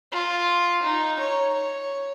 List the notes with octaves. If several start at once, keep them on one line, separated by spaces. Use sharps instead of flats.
F4
D#4
C#5
C#5